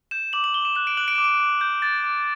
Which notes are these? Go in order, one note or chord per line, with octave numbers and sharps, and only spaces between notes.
G6 E7
D6 F#7
F#7
D6 G7
E7
F#6 E7
D7
F#6 F#7
D7
D6 E7
D7
D6
G6
G6 A6
D6